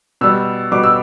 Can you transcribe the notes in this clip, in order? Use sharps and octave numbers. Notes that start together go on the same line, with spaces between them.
B2 G3 E6
B2 G3 D6
E6